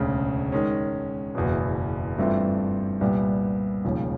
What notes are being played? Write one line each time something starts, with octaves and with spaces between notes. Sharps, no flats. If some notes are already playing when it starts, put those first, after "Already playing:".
Already playing: E1 D2 C#3
D#3 G#3 C#4
F#1 E2 B2
G2 E3 A3 C4 F4
C2 A#2 G3 B3
E1 D#2 C#3 F3